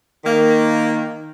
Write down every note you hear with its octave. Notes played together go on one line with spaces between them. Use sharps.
D#3 A#3